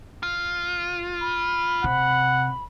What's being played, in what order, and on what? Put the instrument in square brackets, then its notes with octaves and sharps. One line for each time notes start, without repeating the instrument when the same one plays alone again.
[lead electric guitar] F4
[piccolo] B5
[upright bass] C3 [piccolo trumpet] F#5